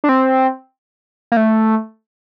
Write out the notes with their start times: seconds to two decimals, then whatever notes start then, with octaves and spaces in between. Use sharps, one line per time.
0.04 D4
0.09 C4
1.32 A#3
1.37 A3